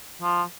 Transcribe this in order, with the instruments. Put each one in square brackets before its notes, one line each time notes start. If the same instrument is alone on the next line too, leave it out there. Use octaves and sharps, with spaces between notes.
[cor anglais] F3